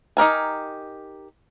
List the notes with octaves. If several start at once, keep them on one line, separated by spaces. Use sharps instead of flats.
D#4 G4 A#4 G#5